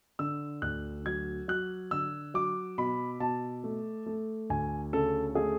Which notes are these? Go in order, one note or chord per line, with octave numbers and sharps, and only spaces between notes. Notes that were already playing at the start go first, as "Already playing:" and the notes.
D3 E6
D2 F#6
F#3 G#6
F#3 F#6
D3 E6
F#3 D6
B2 B5
B2 A5
A3
A3
D2 G#5
C#3 A4
A3 G#4